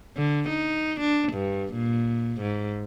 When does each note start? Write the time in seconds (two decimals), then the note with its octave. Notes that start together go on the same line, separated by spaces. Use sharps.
0.17 D3
0.49 D#4
1.00 D4
1.33 G2
1.73 A#2
2.41 G#2